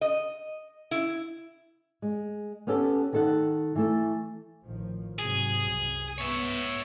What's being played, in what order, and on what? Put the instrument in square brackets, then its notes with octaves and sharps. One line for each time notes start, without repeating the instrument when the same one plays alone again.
[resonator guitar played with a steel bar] D#5
E4
[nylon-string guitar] G#3
B3 C#4 G4 A4
D#3 A4 F#5
E3 A3 A4
[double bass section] A1 D#3 F3
[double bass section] G#2 C3 F#3 [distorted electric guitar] G#4
[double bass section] C2 F#2
[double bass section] B3 [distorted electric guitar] C#5 E5